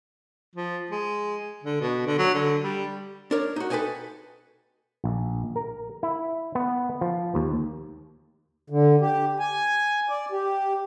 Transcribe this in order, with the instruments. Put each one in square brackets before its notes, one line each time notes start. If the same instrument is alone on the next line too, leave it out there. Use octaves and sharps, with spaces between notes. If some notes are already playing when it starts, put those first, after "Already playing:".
[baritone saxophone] F3
G#3
D3
B2
D3
F#3
D3
G3
[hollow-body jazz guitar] D4 A#4 C#5
D#4 F#4
A4 B4 D5 D#5 G5 G#5
[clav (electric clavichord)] A#1
A#4
E4
B3
F3
D#2
[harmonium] D3
G4
G#5
D5
G4